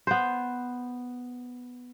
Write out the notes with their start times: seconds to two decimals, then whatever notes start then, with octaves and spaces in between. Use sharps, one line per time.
0.07 B3 C5